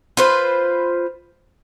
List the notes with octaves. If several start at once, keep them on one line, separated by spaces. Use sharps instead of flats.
F4 B4 C5